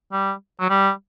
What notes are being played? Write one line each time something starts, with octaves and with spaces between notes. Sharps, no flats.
G3
F#3
G3